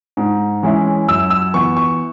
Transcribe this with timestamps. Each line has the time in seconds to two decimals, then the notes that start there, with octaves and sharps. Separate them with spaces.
0.17 G#2
0.63 E3 G#3 C#4 E4
1.08 F#2 E6
1.30 E6
1.54 E3 B3 C#6
1.77 C#6